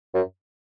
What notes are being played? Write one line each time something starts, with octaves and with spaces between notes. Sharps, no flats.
F#2